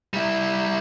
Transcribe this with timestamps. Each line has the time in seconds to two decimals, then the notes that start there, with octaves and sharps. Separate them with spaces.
0.14 G3 E4